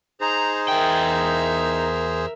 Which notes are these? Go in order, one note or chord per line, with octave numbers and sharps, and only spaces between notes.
D#4 G#4 C5 A#5
E2 A#4 E5 G5